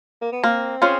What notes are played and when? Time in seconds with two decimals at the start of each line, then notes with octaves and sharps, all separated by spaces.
0.22 A#3
0.32 B3
0.43 A#3 C4
0.82 C#4 F4 G#4 C5